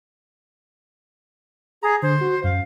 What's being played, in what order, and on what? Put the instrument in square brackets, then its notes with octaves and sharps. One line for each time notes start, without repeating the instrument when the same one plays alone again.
[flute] G#4 [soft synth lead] A#5
[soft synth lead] D3 [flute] C5
[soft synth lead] F#4
[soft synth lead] F#2 [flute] F5